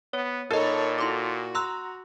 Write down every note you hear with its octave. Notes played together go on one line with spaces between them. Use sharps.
B3 C#5
A#2 D#4 A4 A#4 C#5 D#5 B5
E4 F#4 C6 D6
A#5 C6 E6 F#6